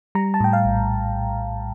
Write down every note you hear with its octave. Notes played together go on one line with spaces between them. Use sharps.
G3 A#5
A5
A2 G5
F5
A#1